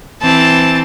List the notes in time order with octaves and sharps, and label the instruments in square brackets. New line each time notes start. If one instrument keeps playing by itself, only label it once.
[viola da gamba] E3 C4 [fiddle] A5